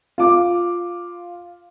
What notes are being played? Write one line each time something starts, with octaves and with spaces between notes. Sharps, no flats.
F4 D6